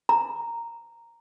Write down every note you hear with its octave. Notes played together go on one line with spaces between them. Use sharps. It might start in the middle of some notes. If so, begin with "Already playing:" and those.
A#5